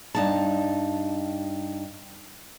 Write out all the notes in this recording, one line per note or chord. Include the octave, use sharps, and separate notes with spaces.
G2 D#4 A5